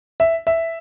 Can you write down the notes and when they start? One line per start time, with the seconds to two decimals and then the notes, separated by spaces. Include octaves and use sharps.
0.20 E5
0.47 E5